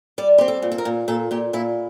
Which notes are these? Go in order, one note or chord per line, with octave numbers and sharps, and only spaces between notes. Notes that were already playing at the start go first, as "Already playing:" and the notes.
G3 D5
C4 G4
A4
A#2
A4
A#4
A#2
A#2 A4
A#2 G4
A#2 E4